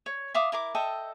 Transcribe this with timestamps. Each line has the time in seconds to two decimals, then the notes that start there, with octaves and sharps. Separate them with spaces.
0.06 C#5
0.34 E5 F5 D6 D#6
0.52 E4 A#4 D6
0.75 A4 D#5 E5 G5